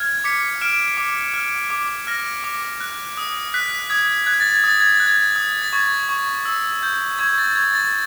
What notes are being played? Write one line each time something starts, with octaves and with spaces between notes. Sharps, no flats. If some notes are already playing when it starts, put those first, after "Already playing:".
Already playing: F6 G#6
D6 B6 C#7
F6 D7 E7
D6
F6
D6
F6 A#6
D6
F#6
D#6
F#6 B6
D#6 G#6
F#6 G#6
A6
G#6
D#6 A6
G#6
A6
F#6
G#6
D#6
A6
C#6 G#6
C#6
E6
G6
C#6 G#6
A6
C#6 G#6
A6